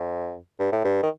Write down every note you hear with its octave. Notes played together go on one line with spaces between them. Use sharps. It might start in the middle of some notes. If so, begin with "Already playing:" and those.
Already playing: F2
G2
A2
G2
D#3